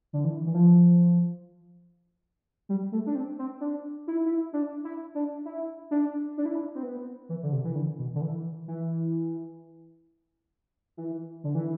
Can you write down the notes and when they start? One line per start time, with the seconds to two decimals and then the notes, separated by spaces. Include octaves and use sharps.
0.13 D3
0.24 E3
0.46 E3
0.54 F3
2.69 G3
2.92 A3
3.06 D4
3.15 C4
3.39 C4
3.61 D4
4.07 E4
4.26 E4
4.53 D4
4.84 E4
5.15 D4
5.45 E4
5.91 D4
6.38 D4
6.46 E4
6.55 D4
6.75 C4
6.83 B3
7.29 E3
7.43 D3
7.52 C3
7.64 E3
7.75 D3
7.98 B2
8.15 D3
8.21 E3
8.68 E3
10.97 E3
11.44 D3
11.55 E3